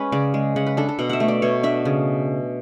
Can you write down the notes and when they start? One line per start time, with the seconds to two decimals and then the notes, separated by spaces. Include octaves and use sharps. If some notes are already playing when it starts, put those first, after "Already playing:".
Already playing: G#3 C#4 B4
0.12 C#3 D5
0.34 G#3
0.56 C#3 F#5
0.66 B4
0.77 D4 A4
0.89 A4
0.99 B2 F#5
1.09 E5 F#5
1.20 A3
1.28 D5
1.42 B2 C#5
1.63 D4 E5
1.85 C#3